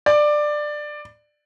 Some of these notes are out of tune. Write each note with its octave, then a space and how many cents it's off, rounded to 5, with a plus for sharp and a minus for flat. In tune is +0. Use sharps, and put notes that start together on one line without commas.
D5 +15